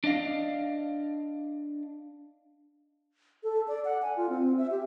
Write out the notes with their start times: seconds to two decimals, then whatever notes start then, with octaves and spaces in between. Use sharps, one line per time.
0.04 D4 D5 D#5 F5
3.43 A4
3.68 D5
3.85 F#5
4.02 G#5
4.17 F4
4.29 C4
4.58 E5
4.71 G4